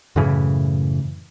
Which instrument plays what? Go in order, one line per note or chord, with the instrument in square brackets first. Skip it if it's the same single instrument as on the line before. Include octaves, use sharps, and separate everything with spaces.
[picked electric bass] F#2 A2 C#3 E3